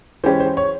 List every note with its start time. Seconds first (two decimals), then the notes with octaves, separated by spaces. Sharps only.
0.24 E3 G#3 C#4 G4 C5
0.40 C5
0.57 C#5